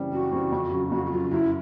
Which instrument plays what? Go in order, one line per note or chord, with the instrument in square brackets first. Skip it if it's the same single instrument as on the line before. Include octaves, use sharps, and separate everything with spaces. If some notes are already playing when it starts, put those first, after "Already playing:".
Already playing: [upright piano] F#2 C#3 E3 G3 C4
[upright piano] F#2 [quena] F#4
[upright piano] C#3 E3 G3 C4
F2
C#3 F#3
[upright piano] F2 [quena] F#4
[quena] F#4
[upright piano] C#3 F#3 [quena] F4
[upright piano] F#2 [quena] E4